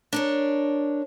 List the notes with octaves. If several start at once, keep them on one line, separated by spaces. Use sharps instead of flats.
D4 A#4 C#5